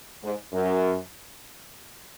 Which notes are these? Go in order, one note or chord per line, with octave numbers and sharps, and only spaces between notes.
G#2
F#2